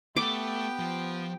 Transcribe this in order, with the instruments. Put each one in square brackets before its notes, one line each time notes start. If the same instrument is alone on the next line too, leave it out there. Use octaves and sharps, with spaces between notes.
[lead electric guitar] A3 [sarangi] B3 [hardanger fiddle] G4 G5 [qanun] D6
[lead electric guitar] F3